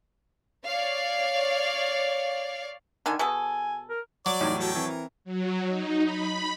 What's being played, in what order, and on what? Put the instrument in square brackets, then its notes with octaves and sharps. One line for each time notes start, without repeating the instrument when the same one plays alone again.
[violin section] C#5 D5 F5
[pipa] D3 D#3 G#5
[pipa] B2 G#4 A4 [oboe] G#5
[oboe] A#4
[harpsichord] F#3 [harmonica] D5 D6
[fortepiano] E2 A2 G3 [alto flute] D#4
[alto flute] F#4 [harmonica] A4 C#5 G5
[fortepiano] E3 [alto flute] C4
[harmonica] A#4
[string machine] F#3
D#4
B5